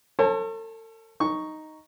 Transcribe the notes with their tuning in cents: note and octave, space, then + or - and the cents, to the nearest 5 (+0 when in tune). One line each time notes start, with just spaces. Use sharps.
A4 +40 C#5 -40 A5 -15
D#4 +0 C#6 +0